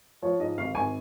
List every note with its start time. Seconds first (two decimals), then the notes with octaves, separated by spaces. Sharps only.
0.22 F3 C#5
0.40 G#2 D#5
0.58 G#1 F5
0.74 G#1 G#5